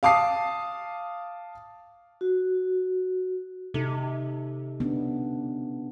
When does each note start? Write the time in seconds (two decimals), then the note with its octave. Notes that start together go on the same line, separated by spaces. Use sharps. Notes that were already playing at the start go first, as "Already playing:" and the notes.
0.03 F5 A5 D6 D#6 C7
2.21 F#4
3.74 C3 D#4 A4
4.80 B3 C#4 D4